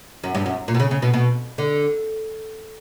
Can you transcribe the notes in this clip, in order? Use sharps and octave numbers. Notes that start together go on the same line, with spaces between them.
F#2
G2
F#2
A#2
B2
C#3
C#3
B2
B2
D3